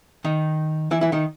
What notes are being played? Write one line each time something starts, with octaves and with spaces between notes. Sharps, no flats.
D#3 D#4
E3 E4
E3 E4
D#3 D#4